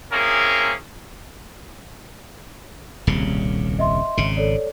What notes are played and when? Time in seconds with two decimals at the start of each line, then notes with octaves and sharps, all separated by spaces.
0.12 A#3 C4 C#4 E4 G#4 A#4
3.07 D#1 C2 C#3
3.79 D#5 E5 C6
4.17 G#1 C#3
4.37 A4 C#5 D5